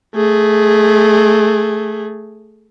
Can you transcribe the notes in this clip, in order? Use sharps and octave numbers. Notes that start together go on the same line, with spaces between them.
A3 G#4